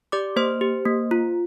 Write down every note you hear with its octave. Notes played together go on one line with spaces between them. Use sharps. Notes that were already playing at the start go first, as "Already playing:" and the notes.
G4 D5 D6
A#3 C5 C6
G4
A#3
F4